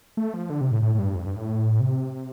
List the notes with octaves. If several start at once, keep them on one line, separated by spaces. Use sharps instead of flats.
A3
F3
D3
C3
A2
A2
A2
G2
F2
G2
A2
C3